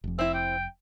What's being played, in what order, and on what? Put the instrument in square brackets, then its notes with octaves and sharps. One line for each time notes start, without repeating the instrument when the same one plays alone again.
[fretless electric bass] F1 F2
[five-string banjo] C4 E4 [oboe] E5
[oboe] G5